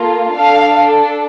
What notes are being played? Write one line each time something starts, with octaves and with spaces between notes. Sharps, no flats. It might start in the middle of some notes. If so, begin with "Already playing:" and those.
Already playing: A#3 F4 A4
D4 A4 F5